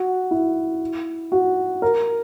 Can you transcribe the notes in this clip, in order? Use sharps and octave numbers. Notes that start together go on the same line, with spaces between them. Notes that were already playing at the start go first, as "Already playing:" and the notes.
Already playing: F#4
E4
F#4
A#4